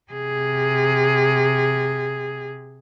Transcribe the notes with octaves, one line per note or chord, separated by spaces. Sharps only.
C3 G#4